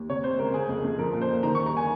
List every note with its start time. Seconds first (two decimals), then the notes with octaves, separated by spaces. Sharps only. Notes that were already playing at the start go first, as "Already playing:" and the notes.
Already playing: D#2
0.09 C3 C#5
0.24 C3 C5
0.39 C#2 A#4
0.54 C#3 G#4
0.69 F2
0.84 F2
0.99 F3 A#4
1.13 A#2
1.21 C5
1.29 A#2
1.43 D#3 A#5
1.55 C#6
1.59 D#2
1.66 A#5
1.77 G#5